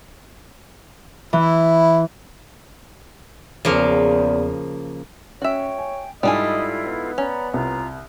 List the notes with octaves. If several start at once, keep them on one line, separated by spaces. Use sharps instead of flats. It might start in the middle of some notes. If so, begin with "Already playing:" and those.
E3 E4
E2 C#3 F3 A#3
C#4 F#4 C#5 E5 G5
G#5
G#2 G3 D4 E4 F4 A4 D#5 G#5
B3
C#4 D5 A#5 B5
C2 F4 A#5